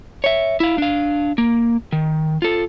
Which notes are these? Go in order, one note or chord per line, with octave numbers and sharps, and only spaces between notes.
C#5 E5
E4 F5
D4 F5
A#3
D#3
F4 A4